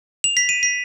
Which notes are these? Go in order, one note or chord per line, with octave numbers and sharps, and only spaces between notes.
F7
B6
D#7
B6